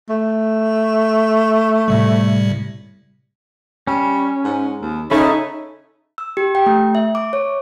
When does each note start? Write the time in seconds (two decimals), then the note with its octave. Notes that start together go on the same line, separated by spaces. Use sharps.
0.09 A3
1.88 A2 C3 G3
3.87 G3 C#4
4.44 G#2
4.82 D#2
5.11 C#3 C#4 D#4 A4 E5 B5
6.18 E6
6.37 G4
6.55 G5
6.66 A3
6.95 E5
7.15 D6
7.33 C#5